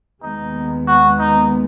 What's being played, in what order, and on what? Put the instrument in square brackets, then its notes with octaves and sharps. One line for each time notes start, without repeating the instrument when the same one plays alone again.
[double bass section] D#2 D#3 G#3 B3 [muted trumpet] D#4
[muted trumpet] F#4
D#4